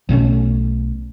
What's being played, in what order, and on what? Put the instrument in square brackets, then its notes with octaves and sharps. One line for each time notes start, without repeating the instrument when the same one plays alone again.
[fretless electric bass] B1 B2 A3 C#4